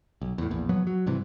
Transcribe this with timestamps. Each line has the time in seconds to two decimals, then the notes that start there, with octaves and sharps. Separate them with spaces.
0.22 B1
0.38 E2 A2
0.51 A#1 E2
0.69 F1 F3 F#3 B3
0.87 F#3
1.06 G2 C3 E3